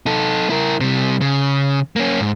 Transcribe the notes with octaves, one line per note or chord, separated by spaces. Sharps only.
D#4 A4
E4 A#4
C3 G3
C#3
A#3 C#4
G#2